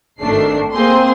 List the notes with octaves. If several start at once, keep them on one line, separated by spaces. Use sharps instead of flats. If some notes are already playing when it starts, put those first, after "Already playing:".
G#1 D#3 A3 D4 C7
A#3 C4 G#4 C6